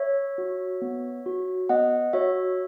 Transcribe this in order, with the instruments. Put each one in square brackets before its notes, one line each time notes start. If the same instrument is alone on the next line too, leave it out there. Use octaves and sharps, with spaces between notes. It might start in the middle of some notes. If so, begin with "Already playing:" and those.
Already playing: [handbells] C#5 E5
F#4
B3
F#4
B3 D#5 F#5
F#4 C#5 E5